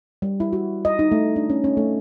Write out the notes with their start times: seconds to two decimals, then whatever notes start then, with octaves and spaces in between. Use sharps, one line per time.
0.22 G3
0.40 E4
0.53 F#4
0.85 D#5
0.99 D#4
1.12 A3
1.36 D4
1.50 C#4
1.64 C#4
1.77 A3